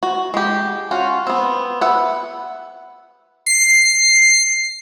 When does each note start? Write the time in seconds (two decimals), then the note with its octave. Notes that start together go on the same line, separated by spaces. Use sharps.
0.03 F#4
0.34 G#3 G4
0.91 C#4 F4 F#4
1.27 B3 C4
1.81 B4 E5 F#5
3.46 C7